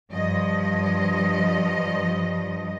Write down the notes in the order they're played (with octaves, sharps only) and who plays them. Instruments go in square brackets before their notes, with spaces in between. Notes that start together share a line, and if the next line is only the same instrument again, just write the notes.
[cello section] G2 F3 D#5